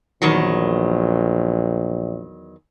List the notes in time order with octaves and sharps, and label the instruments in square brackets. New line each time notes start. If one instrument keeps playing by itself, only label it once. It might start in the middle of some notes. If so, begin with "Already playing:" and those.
[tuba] A#1 [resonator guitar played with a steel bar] E2 D#3 F#3